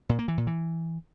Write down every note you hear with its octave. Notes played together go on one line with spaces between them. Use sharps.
A#2
A#3
E3
A#2
E3